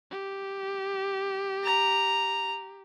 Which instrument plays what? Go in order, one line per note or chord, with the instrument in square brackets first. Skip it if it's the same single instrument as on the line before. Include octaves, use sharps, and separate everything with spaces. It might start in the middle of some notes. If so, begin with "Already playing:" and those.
[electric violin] G4
[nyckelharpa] A#5